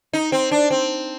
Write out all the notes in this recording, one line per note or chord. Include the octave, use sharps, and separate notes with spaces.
D#4
C4
D4
C4